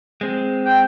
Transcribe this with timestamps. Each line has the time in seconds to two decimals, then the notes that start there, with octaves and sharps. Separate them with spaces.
0.21 G#3 C4
0.65 G5